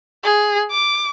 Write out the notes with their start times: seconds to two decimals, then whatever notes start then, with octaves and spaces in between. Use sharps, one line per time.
0.24 G#4
0.71 D6